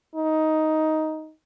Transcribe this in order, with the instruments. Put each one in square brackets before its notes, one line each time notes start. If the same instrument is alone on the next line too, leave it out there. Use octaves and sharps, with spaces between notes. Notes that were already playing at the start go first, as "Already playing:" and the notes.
[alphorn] D#4